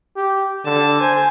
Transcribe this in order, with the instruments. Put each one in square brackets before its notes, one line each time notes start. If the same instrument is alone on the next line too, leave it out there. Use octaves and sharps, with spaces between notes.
[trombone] G4
[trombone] D3 [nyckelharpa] A5
[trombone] C5 [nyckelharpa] G#5